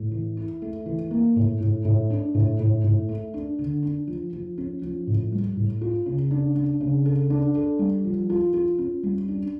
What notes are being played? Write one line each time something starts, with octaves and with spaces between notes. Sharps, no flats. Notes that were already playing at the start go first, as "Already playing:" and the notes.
Already playing: A2
E3
E4
A3
E3
A#3
A2
A2
A2
D4
A2
A2
A2
A3
D4
D3
D4
F3
F3
C#4
F3
A2
G3
A2
F4
C#3
D4
D4
C#3
A4
D4
A4
G3
F3
F4
F4
C#4
G3
D4